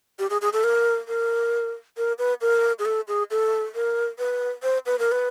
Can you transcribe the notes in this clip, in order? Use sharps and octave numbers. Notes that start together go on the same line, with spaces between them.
G4
G#4
G#4
A4
A#4
A#4
A#4
B4
A#4
G#4
A4
G#4
A4
A#4
B4
C5
B4
A#4
B4